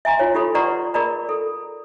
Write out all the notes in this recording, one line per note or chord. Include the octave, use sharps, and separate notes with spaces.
E5 G#5 A#5 C6
F4 C#5
F4 G4 A4 B5 C6
B4 D5 F#5 A#5 C6 C#6
G#4 A#4 D5 A#5 B5
A4